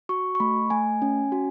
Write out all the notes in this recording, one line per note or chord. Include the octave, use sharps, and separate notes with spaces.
F#4 C#6
C#6
A3 B5
A3 G#5
C#4
F#4